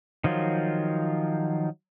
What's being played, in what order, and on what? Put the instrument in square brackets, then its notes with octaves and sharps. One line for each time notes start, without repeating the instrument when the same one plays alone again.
[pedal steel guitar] D#3 F3 F#3 F4